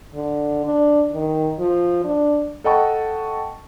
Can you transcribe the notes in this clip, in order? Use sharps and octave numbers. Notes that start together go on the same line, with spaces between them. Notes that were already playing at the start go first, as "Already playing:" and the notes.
D3
D4
D#3
F3
D4
A4 D#5 F#5 G5 A5 C#6